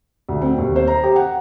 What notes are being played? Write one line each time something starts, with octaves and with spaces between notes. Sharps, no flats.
D2
C4
D#2
C5
A#5
G4
F#5